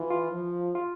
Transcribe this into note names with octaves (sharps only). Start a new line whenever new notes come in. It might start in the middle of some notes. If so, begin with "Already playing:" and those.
Already playing: E3 F4
F4
F3
F4